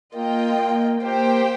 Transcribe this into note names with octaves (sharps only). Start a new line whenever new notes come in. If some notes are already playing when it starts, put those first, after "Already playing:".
A#3 F4 D#5 G5
A#3
A#3 G4 C5 G5